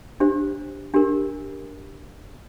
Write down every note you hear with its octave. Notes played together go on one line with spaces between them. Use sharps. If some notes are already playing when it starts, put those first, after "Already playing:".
D4 G4 C5
D4 G4 A#4